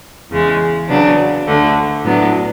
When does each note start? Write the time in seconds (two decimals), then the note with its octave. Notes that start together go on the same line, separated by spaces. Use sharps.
0.30 E2 C#3 G#3
0.88 C#3 F#3 B3 D4
1.46 D2 D3 A3
2.04 A2 F#3 B3 D4